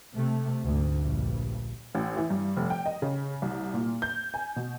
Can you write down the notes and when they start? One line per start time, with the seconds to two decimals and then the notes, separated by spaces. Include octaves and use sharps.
0.16 C3 A3
0.64 D2 G#2
1.00 A#1 G2
1.95 A1
2.17 E3
2.30 G2
2.57 F1
2.70 G5
2.86 D#5
3.02 C#3
3.42 C2
3.74 A#2
4.02 G6
4.34 G#5
4.56 B2